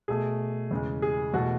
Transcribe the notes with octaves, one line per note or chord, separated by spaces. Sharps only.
B2 A3 G#4
E2 C#3 G#3
G#4
E2 B2 A3 F#4